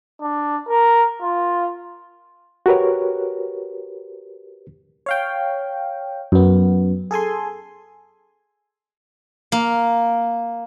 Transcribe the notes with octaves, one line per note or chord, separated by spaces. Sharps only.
D4
A#4
F4
F#4 G4 A#4 B4 C#5
C#5 F5 G5
F#2 B3
G#4 A4 G#5 C6
A#3